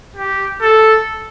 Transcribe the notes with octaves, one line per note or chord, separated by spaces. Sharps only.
G4
A4